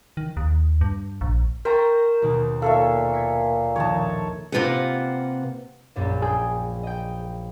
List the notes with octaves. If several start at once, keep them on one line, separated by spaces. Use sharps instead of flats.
D#3
D#2
G2
A#1
A#4 C5 G5 A#5 C#6 A6
D#2 B2 D#3
A#2 B3 A4 B4 C#5 E5 F5
G#6 B6 C#7
A#1 D#3 D#4 C#5 A5
C3 A#3 F4 B4 C5 F#5
A#1 F#2 A#2
G#4 G5
D#5 G5